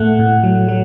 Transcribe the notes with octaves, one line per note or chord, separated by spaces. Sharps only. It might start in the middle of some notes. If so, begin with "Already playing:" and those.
Already playing: A2 A3 F#5
A2
F#3
F#3